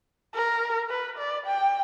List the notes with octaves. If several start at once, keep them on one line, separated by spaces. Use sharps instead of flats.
A#4
B4
D5
G5